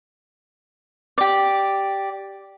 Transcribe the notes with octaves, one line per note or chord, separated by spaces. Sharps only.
G4 D5